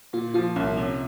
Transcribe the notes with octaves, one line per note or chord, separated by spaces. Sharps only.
A#2 F4
F3 F4
C2 C#4
C3 C#4